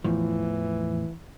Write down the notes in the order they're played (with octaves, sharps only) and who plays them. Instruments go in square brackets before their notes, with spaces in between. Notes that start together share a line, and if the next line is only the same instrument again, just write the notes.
[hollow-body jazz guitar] E2 A2 F3 [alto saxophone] E3